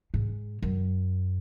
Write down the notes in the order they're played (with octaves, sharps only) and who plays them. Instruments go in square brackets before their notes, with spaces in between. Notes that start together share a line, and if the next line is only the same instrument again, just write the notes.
[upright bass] G#2
F#2